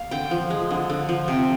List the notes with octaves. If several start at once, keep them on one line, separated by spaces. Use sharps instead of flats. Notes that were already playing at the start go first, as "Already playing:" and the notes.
Already playing: A#3 F5
D3 G5
F3
G#3
D3
D3
F3
C3